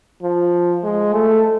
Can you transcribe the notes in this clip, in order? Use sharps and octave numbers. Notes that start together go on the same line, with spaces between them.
F3
G#3
A3